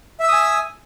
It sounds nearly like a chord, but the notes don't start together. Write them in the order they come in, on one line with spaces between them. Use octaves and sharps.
E5 E6 D#6 G#5